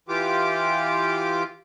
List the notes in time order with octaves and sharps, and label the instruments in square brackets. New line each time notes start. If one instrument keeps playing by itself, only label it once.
[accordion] E3 F4 G4 D6